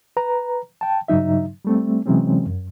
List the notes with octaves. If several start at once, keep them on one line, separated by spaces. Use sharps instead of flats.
B4 A#5
G5 A5
G2 C#3 F#3 D#4 E5
G3 A3 C4
C3 E3 F#3 G#3 C4 C#4
F#2